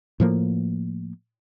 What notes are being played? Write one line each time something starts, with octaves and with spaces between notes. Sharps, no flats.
A2 F3 A#3